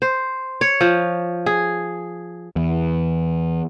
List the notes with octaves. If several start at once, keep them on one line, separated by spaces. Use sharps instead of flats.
C5
C#5
F3
G#4
E2